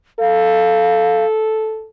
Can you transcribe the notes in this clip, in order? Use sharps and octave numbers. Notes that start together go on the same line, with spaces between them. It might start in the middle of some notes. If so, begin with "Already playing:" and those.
A4 F5